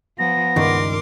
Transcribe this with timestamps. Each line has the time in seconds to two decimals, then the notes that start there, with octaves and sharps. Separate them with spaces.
0.19 F3 B3 A#6
0.56 C#2 G2 D#3 A#4 C6 D6